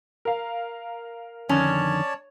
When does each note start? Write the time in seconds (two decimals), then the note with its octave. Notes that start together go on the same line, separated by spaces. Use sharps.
0.25 A#4 F5
1.49 F2 D3 D#3 C#4 C#5 D5 A5